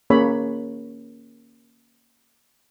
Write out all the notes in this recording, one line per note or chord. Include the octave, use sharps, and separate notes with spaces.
A#3 C#4 G#4 C#5 B5